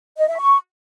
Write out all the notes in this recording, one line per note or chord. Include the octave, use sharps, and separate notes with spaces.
D#5
E5
C#6